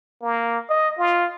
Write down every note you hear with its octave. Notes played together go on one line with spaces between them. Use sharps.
A#3
D#5
F4